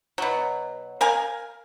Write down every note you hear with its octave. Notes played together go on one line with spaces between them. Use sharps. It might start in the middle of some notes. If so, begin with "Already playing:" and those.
B2 F#3
A#4 F5 G#5